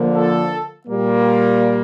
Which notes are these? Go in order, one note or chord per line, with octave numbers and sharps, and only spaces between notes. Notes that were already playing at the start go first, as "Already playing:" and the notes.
Already playing: D3 F3 A#3
A4
A#2 G3 A#3